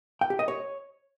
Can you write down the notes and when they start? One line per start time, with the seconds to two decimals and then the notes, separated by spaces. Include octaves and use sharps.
0.21 G5
0.30 G4
0.39 D#5
0.48 C#5